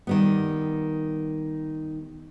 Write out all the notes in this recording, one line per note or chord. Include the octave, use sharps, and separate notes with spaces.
D#3 G3 B3